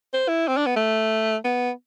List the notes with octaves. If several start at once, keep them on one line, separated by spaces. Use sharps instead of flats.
C5
E4
C4
D4
B3
A3
B3